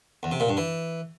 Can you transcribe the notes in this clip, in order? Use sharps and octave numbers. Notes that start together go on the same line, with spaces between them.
E2
C3
A#2
G2
E3